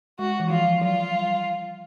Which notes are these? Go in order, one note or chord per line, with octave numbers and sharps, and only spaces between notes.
G#3 F#4
E3
F3 F4
F#3 F4
G3